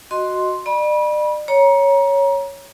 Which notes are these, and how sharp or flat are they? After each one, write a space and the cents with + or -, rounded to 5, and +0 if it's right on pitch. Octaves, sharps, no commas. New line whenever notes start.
F#4 +0 D#5 +0 C6 +0
D5 +40 B5 -30
C#5 +0 A#5 +25